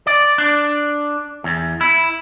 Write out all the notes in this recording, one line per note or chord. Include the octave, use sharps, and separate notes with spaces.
D5
D4
E2
E4